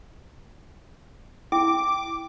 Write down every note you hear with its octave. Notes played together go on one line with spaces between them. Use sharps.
E4 G5 D6